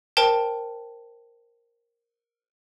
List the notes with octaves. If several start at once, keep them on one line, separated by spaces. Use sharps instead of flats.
A#4 C5 G5 A5